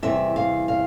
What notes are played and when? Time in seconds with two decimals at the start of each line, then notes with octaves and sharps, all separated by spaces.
0.03 E2 C3 G3 E5
0.36 F5
0.68 F5